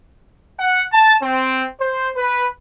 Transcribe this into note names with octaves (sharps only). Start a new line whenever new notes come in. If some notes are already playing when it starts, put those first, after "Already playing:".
F#5
A5
C4
C5
B4